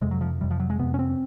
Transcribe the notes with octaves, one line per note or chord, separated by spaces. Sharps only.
F2 C3 G#3
F#3
F3
F2 C3 G3
F3
F#3
G#3
F2 C3 B3
C#4
C4